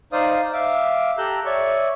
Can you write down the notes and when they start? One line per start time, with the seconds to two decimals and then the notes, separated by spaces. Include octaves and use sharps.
0.13 D#4 C5 D5 F5 D#6
0.53 E5 F5 D6
1.18 G4 A4 A#5 E6 F#6 G6
1.46 C#5 D5 E5 C#6